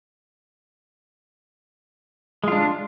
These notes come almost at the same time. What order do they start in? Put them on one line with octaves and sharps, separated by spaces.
G#3 F4 D4